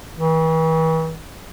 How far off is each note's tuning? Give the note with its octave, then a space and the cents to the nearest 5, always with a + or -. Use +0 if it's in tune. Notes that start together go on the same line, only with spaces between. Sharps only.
E3 -40